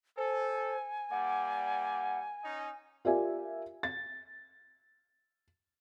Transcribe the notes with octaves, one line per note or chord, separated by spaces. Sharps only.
A4 C5 G#5
G3 A#3 D5 F#5
C#4 D#4
F4 G4 A#4 D5 E5 G#5
A6